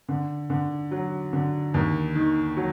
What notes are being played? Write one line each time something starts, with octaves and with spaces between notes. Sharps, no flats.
D3
D3
F#3
D3
D#2
D#3
F#3